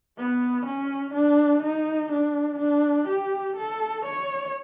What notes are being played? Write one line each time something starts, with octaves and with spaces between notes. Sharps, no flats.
B3
C#4
D4
D#4
D4
D4
G4
A4
C#5